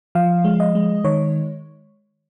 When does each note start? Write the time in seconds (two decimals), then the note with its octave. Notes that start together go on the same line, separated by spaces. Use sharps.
0.15 F3 F5
0.44 G#3
0.60 D#5
0.75 G#3
1.04 D#3 C#5